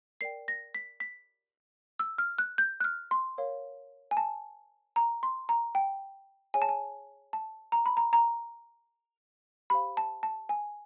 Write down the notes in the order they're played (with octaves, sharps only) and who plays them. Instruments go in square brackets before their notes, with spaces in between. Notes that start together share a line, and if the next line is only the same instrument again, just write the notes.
[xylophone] A#4 D5 G5 C7
A#6
B6
B6
E6
F6
F#6
G6
F#6
F6
C6
A#4 C#5 F5
G#5
A5
A#5
C6
A#5
G5
G#4 C#5 F#5 G#5
A5
G#5
A5
A#5
B5
A#5
A#5
G4 C5 F5 B5
A5
A5
G#5